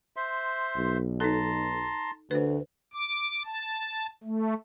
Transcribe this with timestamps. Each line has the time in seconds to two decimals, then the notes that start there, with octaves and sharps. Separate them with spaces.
0.16 C5 E5 C6
0.78 B1
1.20 D#4 A4 A5 A#5 C6
2.31 D2 B4 C5
2.94 D6
3.45 A5
4.24 A3